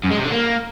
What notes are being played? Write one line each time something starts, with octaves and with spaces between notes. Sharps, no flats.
F#2
G#3
C3
D3
A#3